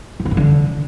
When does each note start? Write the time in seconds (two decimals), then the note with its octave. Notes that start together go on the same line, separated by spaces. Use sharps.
0.20 B2
0.25 C#3
0.31 G2
0.37 D3